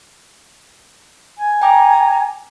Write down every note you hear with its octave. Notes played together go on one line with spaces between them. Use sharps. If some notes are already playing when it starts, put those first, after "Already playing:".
G#5
G5 A#5 D6